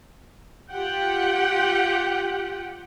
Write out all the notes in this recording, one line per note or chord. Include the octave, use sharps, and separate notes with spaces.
F4 G4 F#5 G5